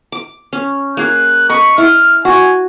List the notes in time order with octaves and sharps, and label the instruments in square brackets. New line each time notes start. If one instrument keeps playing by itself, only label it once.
[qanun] D6
C#4
[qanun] A#3 G#4 [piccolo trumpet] F#6
[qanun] D#5 B5 [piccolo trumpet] C#6
[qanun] E4 [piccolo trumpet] F6
[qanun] F#4 [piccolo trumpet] G#5